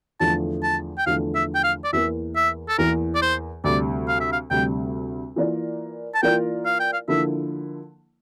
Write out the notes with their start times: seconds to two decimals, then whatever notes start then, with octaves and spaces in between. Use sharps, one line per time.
0.20 E2 D3 F3 A3 A5
0.63 A5
0.98 G5
1.06 E2 D3 F3 A3 F5
1.35 E5
1.55 G5
1.64 F5
1.84 D5
1.93 E2 E3 A#3 E5
2.36 E5
2.68 A4
2.78 E2 E3 A#3 A#4
3.15 D5
3.22 C5
3.64 D2 C3 G3 D5
4.08 F5
4.20 E5
4.32 F5
4.50 D2 C3 G3 G5
5.36 E3 A#3 F4 A#4 D5
6.14 A5
6.22 E3 A#3 F4 A#4 D5 G5
6.66 F5
6.80 G5
6.93 F5
7.08 D3 F3 A#3 E4 E5